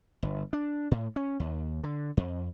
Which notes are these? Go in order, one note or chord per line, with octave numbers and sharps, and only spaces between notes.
G1
D4
A2
C#4
D#2
D3
F2